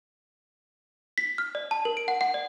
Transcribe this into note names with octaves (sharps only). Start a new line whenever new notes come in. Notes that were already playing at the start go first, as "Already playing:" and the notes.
B6
F6
D5
A5
A#4
D7
F#5
F#5
D5